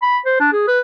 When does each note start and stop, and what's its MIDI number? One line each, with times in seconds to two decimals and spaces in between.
0.02 0.18 83
0.26 0.39 72
0.40 0.52 62
0.53 0.66 68
0.68 0.80 71